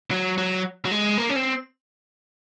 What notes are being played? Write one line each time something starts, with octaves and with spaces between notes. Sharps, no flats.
F#3
F#3
F#3
G#3
A#3
C#4
C4